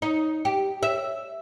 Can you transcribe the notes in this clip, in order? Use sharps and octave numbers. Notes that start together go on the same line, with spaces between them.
D#4
G4
E5